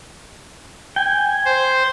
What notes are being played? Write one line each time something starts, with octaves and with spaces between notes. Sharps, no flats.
G5 G#5
C5